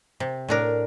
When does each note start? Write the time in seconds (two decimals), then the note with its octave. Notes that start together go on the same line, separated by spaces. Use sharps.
0.20 C3
0.48 A2 D4 A#4